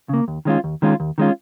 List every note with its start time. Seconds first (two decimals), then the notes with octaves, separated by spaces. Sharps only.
0.09 C#3 A#3
0.28 D#2
0.45 D#3 G#3 C#4 F4
0.64 D#2
0.82 D#3 G#3 C#4 F4
1.00 D#2
1.18 D#3 G#3 C#4 F4